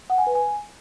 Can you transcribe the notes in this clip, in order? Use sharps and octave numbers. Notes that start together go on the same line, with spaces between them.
F#5
G#5
B4
G#5